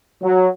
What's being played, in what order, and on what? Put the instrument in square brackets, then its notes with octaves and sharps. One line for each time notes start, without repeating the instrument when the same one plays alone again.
[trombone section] F#3